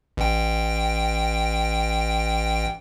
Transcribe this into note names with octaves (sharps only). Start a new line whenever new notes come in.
A1 G5